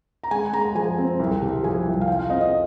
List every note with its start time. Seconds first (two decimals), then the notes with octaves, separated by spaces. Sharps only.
0.24 A#5
0.31 G#3 G#5
0.53 G#3 A#5
0.75 F3 G#5
0.98 C4
1.20 C2
1.42 C3
1.63 F3 G#5
1.86 C2
2.01 F5
2.07 F4 G5
2.19 F5
2.30 C4 D#5
2.41 D#5